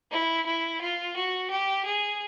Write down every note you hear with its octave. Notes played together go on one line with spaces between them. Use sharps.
E4
E4
F4
F#4
G4
G#4